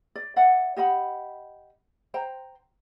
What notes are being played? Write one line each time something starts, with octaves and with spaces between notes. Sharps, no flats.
D5
D5 E5 F#5
G4 D#5 F#5 B5
C5 G5 A#5